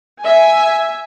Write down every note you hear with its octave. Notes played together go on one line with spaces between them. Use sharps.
E5 G#5